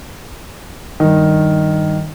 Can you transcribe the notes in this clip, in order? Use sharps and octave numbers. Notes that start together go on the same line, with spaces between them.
G2 D#3